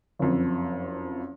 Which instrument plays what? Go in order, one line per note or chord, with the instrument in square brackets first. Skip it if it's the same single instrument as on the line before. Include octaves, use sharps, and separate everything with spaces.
[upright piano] F#1 F2